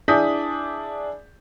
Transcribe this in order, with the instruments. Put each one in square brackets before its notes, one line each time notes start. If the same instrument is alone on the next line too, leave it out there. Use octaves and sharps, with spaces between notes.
[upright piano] D4 E4 G#4 D#6 G6 B6